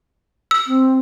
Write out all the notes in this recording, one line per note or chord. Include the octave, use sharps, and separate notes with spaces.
E6
C4